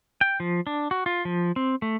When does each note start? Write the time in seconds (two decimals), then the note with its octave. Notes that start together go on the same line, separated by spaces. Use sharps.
0.21 G5
0.40 F3
0.67 D4
0.91 F#4
1.06 F4
1.25 F3
1.56 C4
1.82 A3